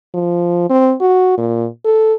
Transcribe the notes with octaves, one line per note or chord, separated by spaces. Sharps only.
F3
C4
F#4
A#2
A4